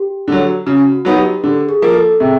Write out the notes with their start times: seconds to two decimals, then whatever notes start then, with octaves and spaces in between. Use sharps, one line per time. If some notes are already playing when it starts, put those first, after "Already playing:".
Already playing: G4
0.28 D3 F#3
0.67 C#3 F#4
0.92 F#4
1.05 F#3 B3 D#4
1.18 G4
1.44 D3 G4
1.69 G#4
1.82 F3 A#3
1.94 A4
2.20 C3 G#4